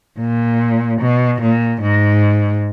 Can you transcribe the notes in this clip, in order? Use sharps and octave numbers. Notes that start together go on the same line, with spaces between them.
A#2
B2
A#2
G#2